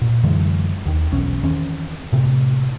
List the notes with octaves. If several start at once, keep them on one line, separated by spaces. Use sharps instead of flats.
A#2
F#2 D3 E3 G#3
D#2 D#3
B1 E2 C#4
E2 D#3 C4 C#4
A2 C3